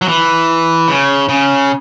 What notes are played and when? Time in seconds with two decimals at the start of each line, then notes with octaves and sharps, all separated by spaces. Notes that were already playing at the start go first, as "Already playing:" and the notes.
0.02 F#3
0.08 E3
0.88 C#3
1.29 C#3